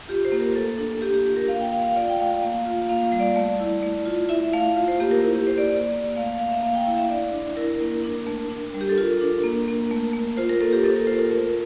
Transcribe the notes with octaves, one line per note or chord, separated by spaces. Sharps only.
F4 G4
C5
A#3
A#4
A3 A4
D4
A#3 G4
G4
F4 G4
A#4
A#3 F5
G5
A#3 F5
F5
F4 D5
G5
A3 F5
A#3
F4
A#3 F5
G3
D5
A3
E4
A3
F4
E4 E5
A3 F5
F4
C5
A#3 G4
A#4
E4
G4
A#3 C5
D5
A#3
A#3
A3 F5
A3 F5
E5
A#3 F5
G5
E4 F5
E5
D4 D5
D4
E4 A#4
A#3
D4
A3
D4
G3
G4
A4
F4 A#4
D4
A#3
A#3
A3
A3
F4 C5
A#4
A#3 A4
G4
A#3 A4
A#4
F4 C5
A#4
A3